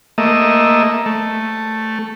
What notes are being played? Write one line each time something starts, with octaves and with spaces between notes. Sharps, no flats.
A3 A#3 D#5 E5
A3